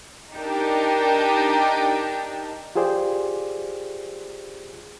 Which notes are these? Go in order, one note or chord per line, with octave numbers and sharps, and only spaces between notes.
D4 D#4 G4 A#4
F4 G4 G#4 C5 D5 G5